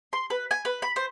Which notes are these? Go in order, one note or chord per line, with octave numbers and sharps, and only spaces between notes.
C6
B4
G#5
B4
B5
C5